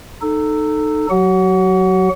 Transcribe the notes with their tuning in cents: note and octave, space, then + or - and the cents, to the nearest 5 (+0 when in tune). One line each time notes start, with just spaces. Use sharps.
D#4 -20 A4 +0
F#3 +0 F#4 +40 F#5 +0